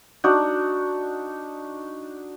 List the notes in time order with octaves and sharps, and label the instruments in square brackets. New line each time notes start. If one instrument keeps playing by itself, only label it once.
[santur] D4 D#4 F#4